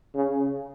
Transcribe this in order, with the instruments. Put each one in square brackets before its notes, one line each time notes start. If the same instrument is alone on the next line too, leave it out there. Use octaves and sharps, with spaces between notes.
[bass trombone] C#3